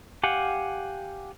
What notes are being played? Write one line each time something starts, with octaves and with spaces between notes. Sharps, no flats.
G4 F5 F#5 G#5